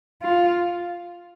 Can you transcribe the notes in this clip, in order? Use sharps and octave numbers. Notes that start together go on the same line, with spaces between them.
F4